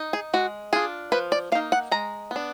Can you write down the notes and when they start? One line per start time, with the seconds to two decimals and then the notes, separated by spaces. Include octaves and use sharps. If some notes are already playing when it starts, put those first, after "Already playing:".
Already playing: D#4
0.13 G#4
0.33 G#3 F#4
0.73 D4 F4 G#4
1.12 F3 B4
1.32 D5
1.52 A#3 F5
1.55 D#4
1.72 F#5
1.91 G#3 A#5
2.31 B3 D4